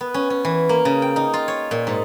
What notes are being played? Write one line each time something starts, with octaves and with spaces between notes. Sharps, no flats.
B3
C#4
C#4
E3
A#3
C#3
G5
D#4
F4
C#5
A#2
G#2